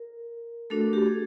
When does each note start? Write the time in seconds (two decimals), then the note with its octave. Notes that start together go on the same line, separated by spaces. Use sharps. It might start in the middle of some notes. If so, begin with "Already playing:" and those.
Already playing: A#4
0.70 A3 D4 F#4 A4
0.93 G4
1.06 G#4